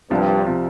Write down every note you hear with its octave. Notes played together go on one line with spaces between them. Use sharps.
C2 G2 C3 F3
C3 F3